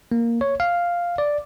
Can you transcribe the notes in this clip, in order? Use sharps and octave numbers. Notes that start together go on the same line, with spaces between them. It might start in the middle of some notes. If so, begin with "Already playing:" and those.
A#3
C#5
F5
D5